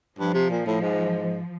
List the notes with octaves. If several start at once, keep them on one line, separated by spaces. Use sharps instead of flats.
G2 F3
C3
A#2
A2
G#2